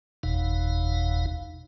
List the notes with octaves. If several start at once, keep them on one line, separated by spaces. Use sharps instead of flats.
F#1 E2 B2 D#4 F5